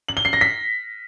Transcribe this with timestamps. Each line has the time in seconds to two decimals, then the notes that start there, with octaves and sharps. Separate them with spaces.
0.08 F#7
0.17 G7
0.25 C7
0.33 A#6
0.41 B6